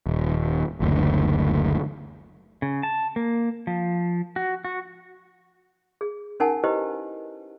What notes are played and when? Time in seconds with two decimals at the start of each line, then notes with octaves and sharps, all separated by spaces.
0.07 D#1
0.80 F#1 D2
2.62 C#3
2.83 A5
3.16 A#3
3.67 F3
4.36 F#4
4.65 F#4
6.01 G#4
6.40 C#4 D#4 A#4 F#5 G#5 A5
6.64 E4 G4 B4 C5 D#5